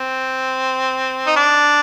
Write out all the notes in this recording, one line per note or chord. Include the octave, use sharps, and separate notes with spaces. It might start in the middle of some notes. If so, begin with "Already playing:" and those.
Already playing: C4
D#4
D4